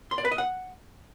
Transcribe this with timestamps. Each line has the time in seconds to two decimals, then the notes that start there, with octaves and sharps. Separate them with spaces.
0.11 C6
0.18 D5
0.25 B4
0.31 D#5
0.38 F#5